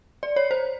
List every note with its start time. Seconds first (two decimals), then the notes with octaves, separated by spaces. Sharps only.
0.23 D5
0.36 C#5
0.51 C5